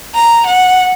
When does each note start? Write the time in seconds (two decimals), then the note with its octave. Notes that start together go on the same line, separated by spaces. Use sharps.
0.15 A#5
0.47 F#5